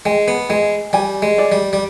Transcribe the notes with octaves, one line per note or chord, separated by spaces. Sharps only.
G#3 G#5
B3
G#3 G#4
G3 G#5
G#3
D5
G3
G3